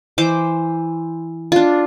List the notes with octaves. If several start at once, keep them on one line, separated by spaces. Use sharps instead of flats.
E3 C5 D6
D4 F4